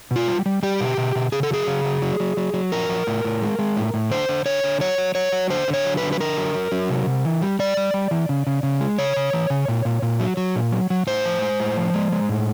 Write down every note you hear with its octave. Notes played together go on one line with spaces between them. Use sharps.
B2 F4
G3
G3
G3 G4
B2
B2
B2
C#3 G#4
A4
F#3 G#4
C#3
F#3
F#3
F#3
F#3
F#3
F3 A#4
F3
A2
A2
G#3
G#3
A2
A2
D3 C5
D3
D3 C#5
D3
F#3 C#5
F#3
F#3 C#5
F#3
D3 C5
D3
C#5
F#3
B4
D3
B4
D3 A#4
F#3
F#3
F#3
C3
C3
E3
G3
G3 D5
G3
G3
E3
C#3
C#3
C#3
G#3
C#3 C#5
C#3
E3
C#3
A#2
A#2
A#2
F#3
F#3
A#2
F#3
F#3
A2 C5
F3
G#3
A2
F3
G#3
G#3
A2